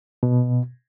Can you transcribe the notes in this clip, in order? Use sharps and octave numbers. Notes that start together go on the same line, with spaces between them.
B2